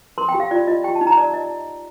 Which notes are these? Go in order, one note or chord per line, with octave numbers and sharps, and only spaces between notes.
A#4 C6
G5
G4
F5
F4 D5
F4 D#5
G4 G5
A5
D#4
A#5
A#4 D5
D#5